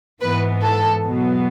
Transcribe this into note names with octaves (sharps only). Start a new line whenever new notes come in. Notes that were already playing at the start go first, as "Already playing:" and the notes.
G#2 E3 B3 B4
A4
E2 B2 F#3 B3